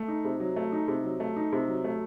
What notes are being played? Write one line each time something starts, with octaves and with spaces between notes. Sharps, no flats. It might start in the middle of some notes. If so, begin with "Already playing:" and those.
Already playing: A3
D#4
C3
F#3
A3
D#4
C3
F#3
A3
D#4
C3
F#3
A3